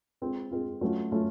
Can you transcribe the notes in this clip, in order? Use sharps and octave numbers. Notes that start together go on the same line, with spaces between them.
G#3 C4 F4
G#3 C4 F4
F#3 A3 C#4 F4
F#3 A3 C#4 F4